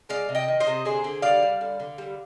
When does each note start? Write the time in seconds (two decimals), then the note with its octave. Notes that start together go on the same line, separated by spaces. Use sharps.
0.09 G#3 D5 F5
0.29 C3
0.35 D#5 G5
0.48 D#3
0.60 C5 D#5
0.67 C3
0.85 D3 G#4 C5
1.04 D3
1.22 G3 D5 F5
1.42 G3
1.61 D3
1.80 D3
1.98 G3